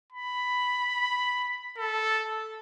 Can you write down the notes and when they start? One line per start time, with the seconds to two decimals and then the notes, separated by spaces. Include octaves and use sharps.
0.12 B5
1.78 A4